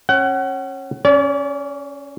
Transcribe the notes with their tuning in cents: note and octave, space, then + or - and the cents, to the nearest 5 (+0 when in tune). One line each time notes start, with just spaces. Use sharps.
C#4 -25 F#5 +30
C#4 +0 D5 -40